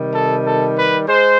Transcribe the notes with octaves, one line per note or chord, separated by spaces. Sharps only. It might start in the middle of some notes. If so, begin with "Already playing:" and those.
Already playing: C3 D#3 G3
A4
A4
B4
G#3 C5